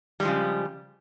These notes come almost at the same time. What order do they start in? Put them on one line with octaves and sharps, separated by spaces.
G3 G#3 F3 C#3